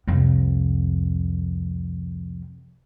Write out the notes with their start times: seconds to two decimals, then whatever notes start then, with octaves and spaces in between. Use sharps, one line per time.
0.07 C2 F2